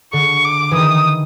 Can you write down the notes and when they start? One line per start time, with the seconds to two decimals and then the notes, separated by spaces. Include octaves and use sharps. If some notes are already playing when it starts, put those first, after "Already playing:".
0.13 D3 C#6
0.45 D6
0.71 D#3 E3 D#6